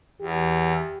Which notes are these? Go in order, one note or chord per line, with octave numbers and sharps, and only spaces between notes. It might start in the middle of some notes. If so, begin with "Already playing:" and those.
E2 G4